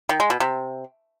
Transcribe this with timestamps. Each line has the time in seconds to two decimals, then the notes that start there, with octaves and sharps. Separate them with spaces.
0.09 D#3
0.20 G#3
0.30 B2
0.40 C3